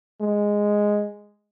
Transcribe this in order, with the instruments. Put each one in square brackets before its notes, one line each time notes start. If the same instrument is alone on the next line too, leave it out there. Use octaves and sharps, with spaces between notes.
[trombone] G#3